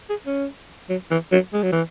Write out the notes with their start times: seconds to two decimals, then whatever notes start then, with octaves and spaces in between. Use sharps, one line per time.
0.10 G#4
0.26 C#4
0.90 F#3
1.11 E3
1.32 F#3
1.53 G#3
1.63 F#3
1.72 E3